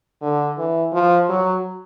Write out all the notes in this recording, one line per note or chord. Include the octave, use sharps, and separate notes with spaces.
D3
E3
F3
F#3